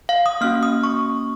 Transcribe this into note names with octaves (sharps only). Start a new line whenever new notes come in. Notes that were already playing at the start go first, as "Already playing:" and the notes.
F5
D#6
A#3 C#4 F#4 F6
D#6
C#6